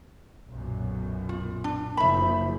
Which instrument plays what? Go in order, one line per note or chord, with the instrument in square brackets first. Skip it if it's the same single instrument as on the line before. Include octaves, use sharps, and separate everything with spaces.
[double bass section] B1 F#2 A#2
[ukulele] F4
D4
[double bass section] F#1 F3 [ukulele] E5 B5